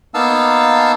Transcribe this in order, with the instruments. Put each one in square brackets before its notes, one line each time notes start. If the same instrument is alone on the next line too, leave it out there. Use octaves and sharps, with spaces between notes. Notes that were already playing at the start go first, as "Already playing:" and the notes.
[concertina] A#3 B3 D#4 F5 A5 E6